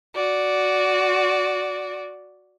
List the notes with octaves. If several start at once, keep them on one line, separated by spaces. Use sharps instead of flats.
F#4 D5